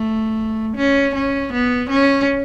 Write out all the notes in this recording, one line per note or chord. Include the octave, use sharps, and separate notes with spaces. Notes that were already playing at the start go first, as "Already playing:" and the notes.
Already playing: A3
C#4
C#4
B3
C#4